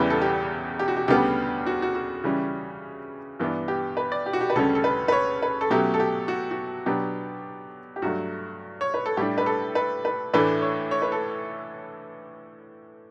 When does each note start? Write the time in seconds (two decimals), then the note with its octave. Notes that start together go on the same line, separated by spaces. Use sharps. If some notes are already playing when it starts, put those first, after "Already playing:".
Already playing: E2 C#3 E3 G3 B4
0.10 A4
0.22 G4
0.79 G4
0.88 F#4
0.97 G4
1.08 D2 C#3 G3 B3 D4 G4
1.66 F#4
1.82 F#4
1.95 F#4
2.24 C#3 E3 G3 C#4
3.40 G2 E3 B3 D4
3.68 G4
3.97 B4
4.12 D5
4.26 G4
4.33 F#4
4.41 G4
4.50 B4
4.55 D2 C#3 G3 C#4 A4
4.75 A4
4.84 B4
5.08 B4
5.12 C#5
5.42 B4
5.61 A4
5.70 B2 F#3 A3 C#4 G4
5.94 A4
6.00 G4
6.28 F#4
6.51 F#4
6.86 B2 F#3 B3 D4 G4
7.96 G4
8.02 G2 F#3 A3 F#4
8.81 C#5
8.94 B4
9.06 A4
9.17 A2 G3 D4 G4
9.38 B4
9.46 A4
9.75 B4
10.05 B4
10.34 A2 E3 A3 D4 B4
10.62 C#5
10.91 C#5
11.02 B4
11.12 A4